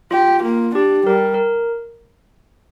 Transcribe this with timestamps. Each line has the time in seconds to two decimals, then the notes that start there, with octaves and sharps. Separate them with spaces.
0.11 F4 G4
0.42 A#3
0.74 D4 G4
1.06 G3 A#4
1.34 A#4